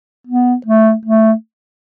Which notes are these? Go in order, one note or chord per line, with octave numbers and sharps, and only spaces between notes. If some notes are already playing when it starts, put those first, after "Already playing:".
B3
A3
A3